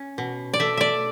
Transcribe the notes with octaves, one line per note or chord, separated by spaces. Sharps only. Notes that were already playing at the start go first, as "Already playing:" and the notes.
Already playing: C#4
B2
D5
A3 E5
D5 E5